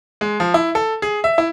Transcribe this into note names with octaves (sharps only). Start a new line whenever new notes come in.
G#3
F3
E4
A4
G#4
E5
E4